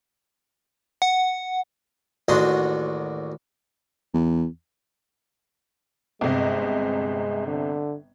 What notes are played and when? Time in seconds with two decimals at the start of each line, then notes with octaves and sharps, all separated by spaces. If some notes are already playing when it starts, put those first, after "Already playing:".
1.02 F#5
2.28 A1 D#2 D4 D#4 F#4 C6
4.14 E2
6.21 G1 C3 G#3 D#5
7.47 D3